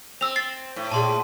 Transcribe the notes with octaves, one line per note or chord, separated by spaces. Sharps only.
C4 E6 F7
A6 C7
A2
A#2 G#4 A5 C6